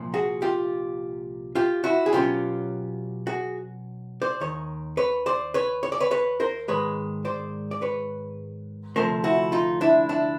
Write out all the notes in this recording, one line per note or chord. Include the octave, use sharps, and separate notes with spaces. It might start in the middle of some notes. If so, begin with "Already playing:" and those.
Already playing: C2 A#2 F3
F#4 G#4
F4 G4
F4 G4
E4 F#4
G#4
B2 F#3 A#3 C#4 F4 G4
F#4 G#4
C5 D5
D#2 D#3 C#5
B4 C#5
C5 D5
B4 C#5
C#5
D5
B4 C#5
B4 C#5
A#4 C5
G#2 D#3 G#3 B4 C#5
C5 D5
D5
B4 C#5
D2 C3 F3 A3 A#4 C5
E4 F#4
D#4 F4
D4 E4
D4 E4